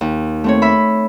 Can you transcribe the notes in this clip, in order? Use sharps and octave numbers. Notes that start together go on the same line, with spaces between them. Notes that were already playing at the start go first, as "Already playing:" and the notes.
D#2
A3 C4 C#5
E5 B5